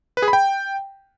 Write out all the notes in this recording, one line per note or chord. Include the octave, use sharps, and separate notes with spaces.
B4
G#4
B5
G5